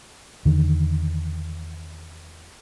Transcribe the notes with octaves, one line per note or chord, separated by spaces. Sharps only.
E2 D3 D#3